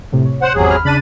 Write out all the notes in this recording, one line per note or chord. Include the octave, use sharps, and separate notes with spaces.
A2 C3
C#5
C5 F#5
G#1 E2 C3 F#3 G#4
B5 F6
C#3 D4 B5 A6 D#7